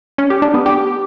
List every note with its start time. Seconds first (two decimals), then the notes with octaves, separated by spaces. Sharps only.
0.18 C#4
0.30 G4
0.42 D4
0.54 B3
0.66 G4